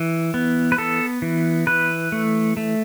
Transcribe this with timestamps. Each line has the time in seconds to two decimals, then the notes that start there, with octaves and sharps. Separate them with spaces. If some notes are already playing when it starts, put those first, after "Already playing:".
Already playing: E3
0.34 B3
0.72 B4
0.78 B3 A4
1.22 E3
1.67 E3 B4
2.12 A3
2.57 A3